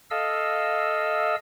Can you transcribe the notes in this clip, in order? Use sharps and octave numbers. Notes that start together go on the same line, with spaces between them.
A4 D#5 F5 E6